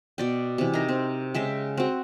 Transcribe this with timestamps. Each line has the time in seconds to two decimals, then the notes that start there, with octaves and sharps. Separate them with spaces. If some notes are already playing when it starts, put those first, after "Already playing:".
0.18 B2 D5 G5
0.58 C3 E3
0.73 D#4 A#4
0.89 C4
1.34 C#3 G#3 E5 G5
1.77 C4 F#4